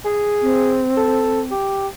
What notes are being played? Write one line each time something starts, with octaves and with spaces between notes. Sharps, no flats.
G#4
C4
A4
G4